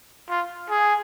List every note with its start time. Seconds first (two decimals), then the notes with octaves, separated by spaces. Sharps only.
0.29 F4
0.70 G#4